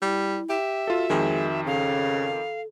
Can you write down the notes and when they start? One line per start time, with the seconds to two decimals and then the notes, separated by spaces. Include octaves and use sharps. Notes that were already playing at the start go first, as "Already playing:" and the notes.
0.02 G3 E4
0.49 G4 E5
0.87 F4 F#4 A4
1.10 F2 D#3 G#3
1.66 C#3 A4 F5